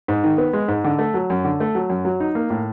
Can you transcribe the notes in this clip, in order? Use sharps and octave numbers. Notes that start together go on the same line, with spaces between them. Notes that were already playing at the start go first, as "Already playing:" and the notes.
G#2
D#3
B3
G#3
G#2
D3
A3
F#3
F#2
D3
A3
F#3
F#2
F#3
D#4
A#3
A2